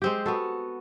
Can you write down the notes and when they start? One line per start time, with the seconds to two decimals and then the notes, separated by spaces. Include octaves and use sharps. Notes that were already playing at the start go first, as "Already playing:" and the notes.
0.02 G#3 C4 G4
0.26 B3 F#4 A4